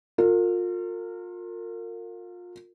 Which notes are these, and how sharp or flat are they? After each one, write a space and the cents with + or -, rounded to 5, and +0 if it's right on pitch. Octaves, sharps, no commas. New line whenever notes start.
F4 +30 A#4 -40